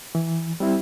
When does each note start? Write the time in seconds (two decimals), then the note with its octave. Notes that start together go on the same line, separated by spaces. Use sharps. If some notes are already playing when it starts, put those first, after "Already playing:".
0.15 E3
0.60 G3 C4 E4